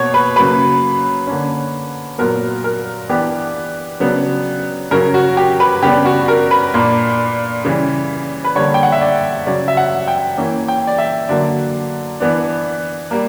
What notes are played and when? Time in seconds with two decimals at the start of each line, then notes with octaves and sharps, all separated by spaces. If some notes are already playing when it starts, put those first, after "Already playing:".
Already playing: B2 A#3 C#5
0.14 B4
0.36 C#3 F#3 A#3 B4
1.27 D3 A#3 C#4
2.18 A#2 F#3 B3 A#4
2.64 A#4
3.09 E3 B3 D4 G4
4.00 C#3 F#3 B3 D4
4.91 C#3 F#3 C#4 A#4
5.14 F#4
5.37 G4
5.60 B4
5.82 C#3 G3 B3 D4 G4
6.05 F#4
6.28 A#4
6.51 B4
6.74 A#2 A#3 D4
7.65 C#3 E3 G3
8.44 B4
8.55 D3 G3 A#3 D4 C#5
8.74 G5
8.83 F#5
8.92 E5
9.01 D5
9.46 C#3 F#3 C#4 D5
9.68 E5
9.77 F#5
10.08 G5
10.38 E3 A#3 C#4
10.68 G5
10.87 D5
10.98 E5
11.29 D3 F#3 A#3 D5
12.20 E3 B3 D4
13.11 G3 A#3